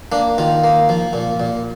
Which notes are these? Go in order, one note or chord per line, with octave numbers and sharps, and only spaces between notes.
A#3 D4
D#3 F4
A#3
F3
A#2
A#2